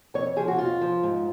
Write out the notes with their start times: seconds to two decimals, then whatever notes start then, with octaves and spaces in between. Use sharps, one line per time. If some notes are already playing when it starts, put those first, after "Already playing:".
0.14 F2 C#5
0.36 F3 G#4
0.48 F#4
0.58 F2 F4
0.81 F3
1.03 G#2